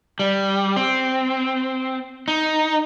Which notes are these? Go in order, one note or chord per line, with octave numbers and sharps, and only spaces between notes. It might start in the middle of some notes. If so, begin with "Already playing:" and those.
G3
C4
D#4